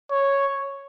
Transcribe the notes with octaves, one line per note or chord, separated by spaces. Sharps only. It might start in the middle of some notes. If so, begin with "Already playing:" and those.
C#5